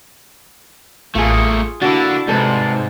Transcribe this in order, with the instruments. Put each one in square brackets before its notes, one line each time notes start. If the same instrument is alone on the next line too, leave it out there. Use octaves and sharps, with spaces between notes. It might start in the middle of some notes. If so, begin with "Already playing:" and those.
[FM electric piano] A1 C#7 [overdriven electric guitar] A3 A#3 [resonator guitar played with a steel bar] F4 G#4
[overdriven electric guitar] D3 [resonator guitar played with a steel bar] A#3 F#4 [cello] D4 E4 [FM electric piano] A6
[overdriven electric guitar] G#2 [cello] C3 [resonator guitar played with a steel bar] G3 A4 B4